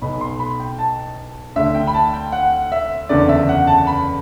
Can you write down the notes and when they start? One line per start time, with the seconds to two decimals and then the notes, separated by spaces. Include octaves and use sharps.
0.02 B1 B2 B5
0.21 C6
0.39 B5
0.60 G5
0.79 A5
1.56 D2 D3 E5
1.74 G5
1.87 B5
1.94 A5
2.13 G5
2.32 F#5
2.72 E5
3.09 F#1 E2 D3 D5
3.29 E5
3.49 F#5
3.67 A5
3.87 B5